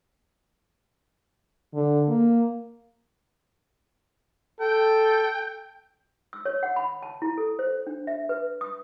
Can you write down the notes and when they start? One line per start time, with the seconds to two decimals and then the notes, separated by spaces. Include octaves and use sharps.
1.74 D3
2.08 A#3
4.60 A4 G5
6.33 E6
6.45 C#5
6.63 F#5
6.76 B5
7.03 A5
7.22 E4
7.38 A4
7.59 C5
7.87 D4
8.07 E5
8.29 B4
8.61 D#6